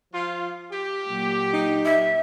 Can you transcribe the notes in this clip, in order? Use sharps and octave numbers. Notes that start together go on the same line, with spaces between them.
F3 F4
G4
A#2 F#3
D#4
E5